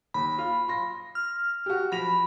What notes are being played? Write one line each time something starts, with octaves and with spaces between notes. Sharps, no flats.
D#2 B5
F4
C6 A#6
F6
F#4 G4
F3 B5 A#6 F7